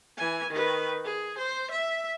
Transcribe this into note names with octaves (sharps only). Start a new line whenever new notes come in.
E3 G#5
D#3 B4
G#4
C5
E5